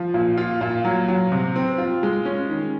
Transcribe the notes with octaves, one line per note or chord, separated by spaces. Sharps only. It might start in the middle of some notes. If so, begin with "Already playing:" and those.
Already playing: F3
A#2
F4
A#2
F#3
F#3
C3
C4
F4
G#3
C#4
D#3